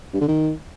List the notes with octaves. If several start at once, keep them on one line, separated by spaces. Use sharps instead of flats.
G2
D3
D#3